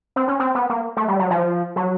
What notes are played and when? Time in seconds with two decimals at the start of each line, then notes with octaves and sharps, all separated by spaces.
0.16 C4
0.28 C#4
0.40 C4
0.55 B3
0.69 A#3
0.97 A3
1.08 G3
1.19 F#3
1.30 F3
1.76 F#3